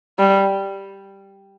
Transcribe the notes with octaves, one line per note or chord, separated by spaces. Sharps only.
G3